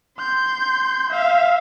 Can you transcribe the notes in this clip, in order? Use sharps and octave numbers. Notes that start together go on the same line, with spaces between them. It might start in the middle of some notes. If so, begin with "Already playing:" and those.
C6 G6
E5 F5